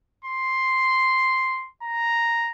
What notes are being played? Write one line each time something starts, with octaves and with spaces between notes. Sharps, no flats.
C6
A#5